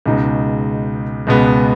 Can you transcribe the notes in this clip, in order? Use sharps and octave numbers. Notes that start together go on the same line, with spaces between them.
C#2 B2 G#3 D#4
C#2 B2 G#3 B3